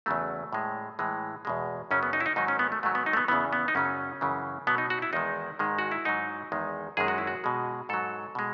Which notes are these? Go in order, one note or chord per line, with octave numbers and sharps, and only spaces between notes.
E2 C#3 F#3 A3
A2 G#3
A2 E3 G#3
E2 B2 G#3
F#2 C#3 F#3 C#4
B3
D#4
E4
D#4
G#2 D#3 F#3 D#4
C#4
B3
A3
G#2 D#3 F#3 A3
B3
D#4
A3
B3
E2 C#3 E3 B3
B3
D#4
F#2 C#3 F#3 C#4
F#2 C#3 E3
B2 F#3 B3
D#4
F#4
E4
E2 D#3 G#3 D#4
G#2 D#3 G#3
F#4
E4
G#2 F#3 D#4
E2 D#3 G#3
F#2 D#3 G#3 G#4
F#4
E4
F#4
B2 G#3
G#2 F#3 A4
B2 G#3